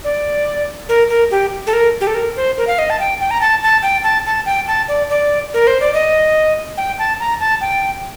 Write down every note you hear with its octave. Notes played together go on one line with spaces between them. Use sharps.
D5
A#4
A#4
G4
A4
A#4
G4
A4
A#4
C5
A#4
F5
D#5
A5
G5
G5
A#5
A5
A5
G5
A5
A5
G5
A5
D5
D5
A#4
C5
D5
D#5
G5
A5
A#5
A5
G5